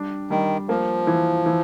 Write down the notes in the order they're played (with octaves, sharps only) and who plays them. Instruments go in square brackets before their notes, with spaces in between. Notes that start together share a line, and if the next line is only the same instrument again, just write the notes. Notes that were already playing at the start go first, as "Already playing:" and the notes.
Already playing: [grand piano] G3 D4
[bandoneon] D#3 [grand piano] G3
[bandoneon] F3 [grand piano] A#3
[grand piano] E3
E3